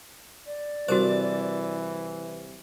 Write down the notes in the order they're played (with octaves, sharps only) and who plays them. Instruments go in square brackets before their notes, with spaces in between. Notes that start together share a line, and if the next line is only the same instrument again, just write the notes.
[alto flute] D5
[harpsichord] C2 A5 D6 [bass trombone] E3 [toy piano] F#4 A#4 C5